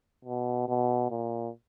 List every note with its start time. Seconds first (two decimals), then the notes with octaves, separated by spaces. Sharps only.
0.25 B2
0.68 B2
1.11 A#2